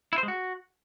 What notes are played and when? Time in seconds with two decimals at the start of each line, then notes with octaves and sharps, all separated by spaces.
0.13 E4
0.18 C5
0.23 G#3
0.28 F#4